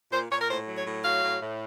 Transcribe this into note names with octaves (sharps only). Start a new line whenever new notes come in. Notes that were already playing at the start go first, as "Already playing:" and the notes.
A#2 C5
A#2 C#5
A#4
A2 C5
F#3
C#5
A2
F#3 F5
A2
A2